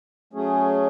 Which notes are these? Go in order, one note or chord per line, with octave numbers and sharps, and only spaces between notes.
F#3 A3 C#4 G#4